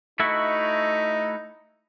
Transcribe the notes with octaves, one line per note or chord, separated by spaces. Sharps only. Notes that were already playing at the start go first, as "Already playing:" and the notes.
A3 D#4 E4 F#4